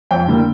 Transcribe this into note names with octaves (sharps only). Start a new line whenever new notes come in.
F2 G5
D3 G3 A#3